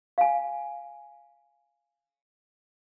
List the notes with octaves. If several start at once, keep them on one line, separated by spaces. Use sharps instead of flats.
F5 G#5